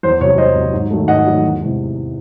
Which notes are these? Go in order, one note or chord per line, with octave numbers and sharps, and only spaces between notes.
E2 C5
C3 F#3 C#5
E2 C5 D#5
C3 F#3
G#2
D#3 F#3 A3
G#2 D#5 F#5
D#3 F#3 A3
E2
C3 E3 G#3